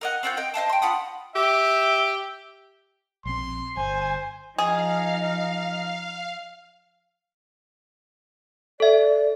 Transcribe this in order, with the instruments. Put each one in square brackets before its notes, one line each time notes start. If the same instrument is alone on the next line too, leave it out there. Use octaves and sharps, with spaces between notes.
[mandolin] A#4 D#5 F#5
C4 F4 F#4 G6
D#5 G5
C5 D#5 F5 A5
G5 C6
F4 F#5 B5 D#6
[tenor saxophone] G4 [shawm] E5
[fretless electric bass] A#1 C4 [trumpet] C6
[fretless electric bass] G1 [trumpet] C5 [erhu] G#5
[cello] F3 D#4 [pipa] G#4 [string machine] F5
[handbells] A4 E5 [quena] D5